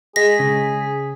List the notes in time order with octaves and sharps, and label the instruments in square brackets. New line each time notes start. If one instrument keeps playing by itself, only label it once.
[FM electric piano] G#3 B6 [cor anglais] G#4 [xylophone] A#6
[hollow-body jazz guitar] C#3